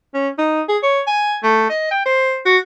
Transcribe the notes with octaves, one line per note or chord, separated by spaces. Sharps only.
C#4
D#4
G#4
C#5
G#5
A3
D#5
G5
C5
F#4